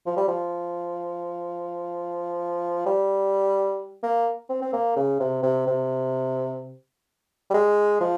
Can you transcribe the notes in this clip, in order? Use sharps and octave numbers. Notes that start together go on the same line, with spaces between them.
F3
G3
F3
G3
A#3
C4
C4
A#3
C#3
C3
C3
C3
G3
G#3
F3